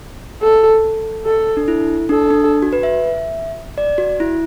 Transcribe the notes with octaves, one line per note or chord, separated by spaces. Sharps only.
A4
A4
D4
E4
D4 A4
D4
F#4
B4
E5
D5
F#4
E4